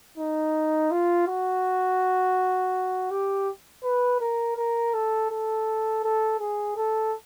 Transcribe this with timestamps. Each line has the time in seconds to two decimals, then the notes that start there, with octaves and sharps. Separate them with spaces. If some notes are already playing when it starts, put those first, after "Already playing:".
0.18 D#4
0.91 F4
1.27 F#4
3.11 G4
3.84 B4
4.21 A#4
4.57 A#4
4.94 A4
5.30 A4
6.04 A4
6.40 G#4
6.76 A4